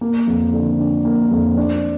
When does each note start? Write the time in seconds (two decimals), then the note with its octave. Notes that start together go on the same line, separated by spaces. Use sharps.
0.01 A#3
0.27 F2
0.53 D3
0.79 D4
1.05 A#3
1.31 F2
1.57 D4